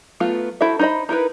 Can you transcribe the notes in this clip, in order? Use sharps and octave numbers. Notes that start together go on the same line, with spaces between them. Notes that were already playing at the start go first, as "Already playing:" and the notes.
F#3 A3 B3 F4
E4 F#4 A4 C5 E5
D#4 E4 C5 D#5 B5
D#4 E4 A#4 B4